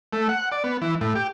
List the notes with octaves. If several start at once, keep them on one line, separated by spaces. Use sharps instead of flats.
A3
F#5
D5
B3
E3
A2
G4